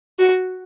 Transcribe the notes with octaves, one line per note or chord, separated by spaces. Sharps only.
F#4